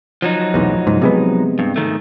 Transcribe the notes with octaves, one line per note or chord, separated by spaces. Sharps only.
F3 F#3 D#4
F1 B1 E2
C#2 G#2
C3 G#3 B3
G2
G#2 D#3 A3